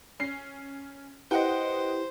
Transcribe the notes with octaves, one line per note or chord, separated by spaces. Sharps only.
C#4 C7
E4 G4 B4 C5 D#5 F#5 G5